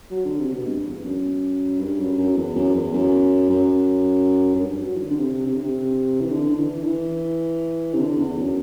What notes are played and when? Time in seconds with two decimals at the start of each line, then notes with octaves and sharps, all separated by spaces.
0.11 F#3
0.25 D3
0.39 C3
0.53 B2
0.67 G2
0.86 E2
1.05 F#2
1.80 G2
1.99 F#2
2.18 F#2
2.36 E2
2.55 F#2
2.74 E2
2.93 F#2
3.49 F#2
4.55 F#2
4.62 G2
4.80 F#3
4.95 E3
5.00 D3
5.11 D3
5.18 C3
5.46 C3
5.55 D3
5.63 C3
6.21 E3
6.31 D3
6.50 D3
6.59 E3
6.84 D3
6.88 E3
7.94 C3
8.00 D3
8.19 E2
8.37 F#2